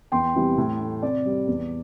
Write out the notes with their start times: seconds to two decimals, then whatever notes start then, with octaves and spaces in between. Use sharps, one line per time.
0.12 E2 G5 C6
0.35 C3 E3 G3
0.57 A2
0.80 A3
1.02 C3 D5
1.25 G3
1.47 E2